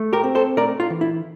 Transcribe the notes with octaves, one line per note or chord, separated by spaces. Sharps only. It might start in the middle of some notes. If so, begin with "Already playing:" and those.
Already playing: A3
G4 A#4
C4
A4 C5
A3 A#4 D5
F4
E3
E4